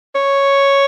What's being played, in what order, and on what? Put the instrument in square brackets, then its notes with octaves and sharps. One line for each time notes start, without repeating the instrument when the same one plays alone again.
[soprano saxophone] C#5